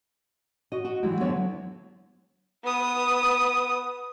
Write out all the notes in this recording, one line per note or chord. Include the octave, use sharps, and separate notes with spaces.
F#4 D#5
F#4
E3 F#3 G#3 E4 G4
F2 D3 F#3 B3 C#5 E5
B3 D#6